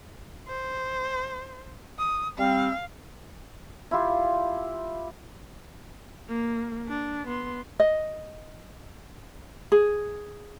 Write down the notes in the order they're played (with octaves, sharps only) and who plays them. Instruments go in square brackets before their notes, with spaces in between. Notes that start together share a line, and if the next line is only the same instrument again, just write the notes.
[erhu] C5
D#6
[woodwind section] G3 C4 [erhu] F5
[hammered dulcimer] E4 F4 G4
[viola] A#3
D4
B3 C6
[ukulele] D#5
G#4